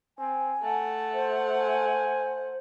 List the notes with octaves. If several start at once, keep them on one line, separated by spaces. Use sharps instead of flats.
C4 G#5
A3 F#5 A5
C5
G#5